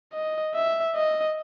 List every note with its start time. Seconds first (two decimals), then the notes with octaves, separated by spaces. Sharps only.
0.13 D#5
0.55 E5
0.95 D#5